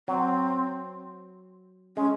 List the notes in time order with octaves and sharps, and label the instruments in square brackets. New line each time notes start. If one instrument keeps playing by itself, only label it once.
[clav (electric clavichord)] F#3 [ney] C4
[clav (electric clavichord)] G#3 [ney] C#4